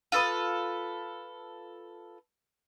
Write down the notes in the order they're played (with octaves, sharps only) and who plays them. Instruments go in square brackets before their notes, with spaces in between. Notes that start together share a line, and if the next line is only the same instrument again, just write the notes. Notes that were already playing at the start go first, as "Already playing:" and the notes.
[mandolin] F4 A4 B4 D#6